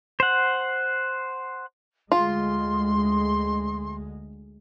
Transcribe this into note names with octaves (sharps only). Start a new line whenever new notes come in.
C5 F#5
D2 G#3 F4 C6